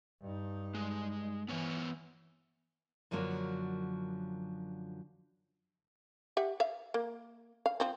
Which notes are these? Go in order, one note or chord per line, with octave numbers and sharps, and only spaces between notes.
G2 D#4
G#3
E3 B3 C#5 G#5
F#2 D3 F3 F#3 A#3 F#4
G4 E5 F#5
E5 F5
A#3
F5
F3 C4